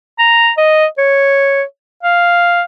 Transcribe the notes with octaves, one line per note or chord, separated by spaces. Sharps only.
A#5
D#5
C#5
F5